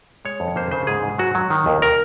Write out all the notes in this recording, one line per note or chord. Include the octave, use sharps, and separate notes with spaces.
G#3 C#5
F2
A#3 C5
C#3 C5
G#2 G#4
G#2
F#3 F#4
F#3
D#3
D#2
A#4